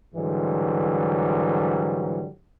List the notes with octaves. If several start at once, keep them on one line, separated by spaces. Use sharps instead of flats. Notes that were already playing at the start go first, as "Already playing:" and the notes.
G#2 D3 E3 F#3 G3